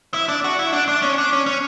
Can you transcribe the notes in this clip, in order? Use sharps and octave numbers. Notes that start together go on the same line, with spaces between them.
E4
D4
F#4
E4
D4
D4
C#4
D4
C#4
C#4